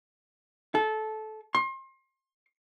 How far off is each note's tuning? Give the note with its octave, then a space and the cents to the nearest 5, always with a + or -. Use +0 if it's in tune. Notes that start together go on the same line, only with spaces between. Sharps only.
A4 -20
C6 +35